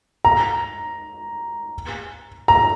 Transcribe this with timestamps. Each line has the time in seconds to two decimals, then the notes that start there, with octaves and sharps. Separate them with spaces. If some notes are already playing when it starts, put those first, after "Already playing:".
0.25 A#5
2.48 A#5